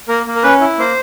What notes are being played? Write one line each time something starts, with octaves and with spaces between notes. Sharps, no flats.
A#3 A#4
A#3
A#4
C#4 B4
E4
A#3 C5